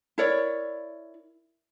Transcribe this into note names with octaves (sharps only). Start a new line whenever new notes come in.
E4 A#4 C#5 D5